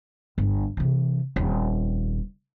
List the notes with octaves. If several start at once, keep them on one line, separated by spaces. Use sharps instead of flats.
G1
C3 E3
D#1 F2